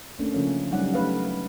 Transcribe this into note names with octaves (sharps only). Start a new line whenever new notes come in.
A3 A#3 C#4 D4
C#3 F3 C#4
F#3 G3 C#4 D#4 D5 F#5
A3 B4 F5